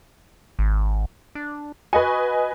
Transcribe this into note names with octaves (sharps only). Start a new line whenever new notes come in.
G#1
D4
F#4 B4 D#5 G#5